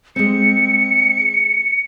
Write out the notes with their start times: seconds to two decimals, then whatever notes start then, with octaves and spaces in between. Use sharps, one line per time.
0.16 G#3 C4 C#7